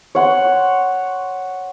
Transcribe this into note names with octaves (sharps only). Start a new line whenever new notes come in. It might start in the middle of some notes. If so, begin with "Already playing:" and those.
C#5 F#5 C6